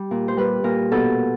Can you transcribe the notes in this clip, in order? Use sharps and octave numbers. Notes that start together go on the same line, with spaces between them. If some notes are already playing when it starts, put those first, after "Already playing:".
Already playing: G3
A#2
C5
G3 B4
A#2 A#4
B2 A4